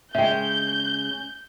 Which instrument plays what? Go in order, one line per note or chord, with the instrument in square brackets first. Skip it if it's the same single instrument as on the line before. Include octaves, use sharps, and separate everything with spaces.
[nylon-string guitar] C#3 G#3 [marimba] E5 G5 [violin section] G6